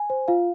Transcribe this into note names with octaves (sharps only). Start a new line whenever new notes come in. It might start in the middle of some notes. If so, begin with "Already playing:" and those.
Already playing: G#5
C5
F4 F5